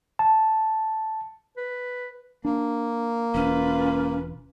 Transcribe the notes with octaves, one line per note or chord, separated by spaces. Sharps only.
A5
B4
A#3 D4
E1 C#4 F4 B4